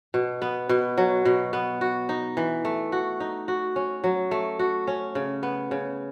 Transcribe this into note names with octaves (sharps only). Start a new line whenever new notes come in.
B2
B3
B2
F#3
B2
B3
F#4
D#4
E3
A3
F#4
D#4
F#4
C#4
F#3
A3
F#4
C#4
C#3
B3
C#3